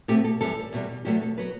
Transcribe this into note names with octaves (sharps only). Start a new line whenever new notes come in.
B2 A3 C4 G4
A4
F#2 E3 G3 A4
E2 B2 G3
E2 B2 F#3 A3 G4
A4
F#3 B3 B4